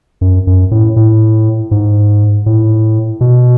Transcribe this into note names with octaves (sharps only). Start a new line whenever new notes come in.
F#2
F#2
A2
A2
G#2
A2
B2